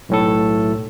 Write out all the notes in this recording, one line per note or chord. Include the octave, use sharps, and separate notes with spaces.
B1 A2 A4